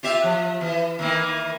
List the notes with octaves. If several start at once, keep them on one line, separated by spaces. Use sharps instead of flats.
F4 G4 E5
F3
E3
D#3 E3 A#3